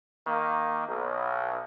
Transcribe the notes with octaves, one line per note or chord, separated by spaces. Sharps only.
D#3 A#3
B1